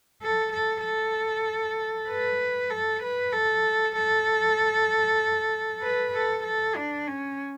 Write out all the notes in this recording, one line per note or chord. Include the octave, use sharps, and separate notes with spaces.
A4
A4
A4
B4
A4
B4
A4
A4
B4
A4
A4
D4
C#4